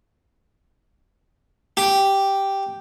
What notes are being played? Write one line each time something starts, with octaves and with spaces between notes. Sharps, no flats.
G4